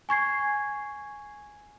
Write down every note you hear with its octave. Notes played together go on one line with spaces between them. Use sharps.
G#5 C#6 G#6 C7